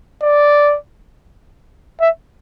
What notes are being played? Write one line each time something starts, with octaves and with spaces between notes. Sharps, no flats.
D5
E5